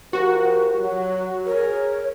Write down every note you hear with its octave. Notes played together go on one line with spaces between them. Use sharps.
F3 F#4 G4 A#4
F#3
G#4 A#4 C#5